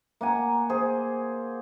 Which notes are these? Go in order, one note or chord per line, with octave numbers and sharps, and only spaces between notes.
A#3 F#5 G#5
G#4 C5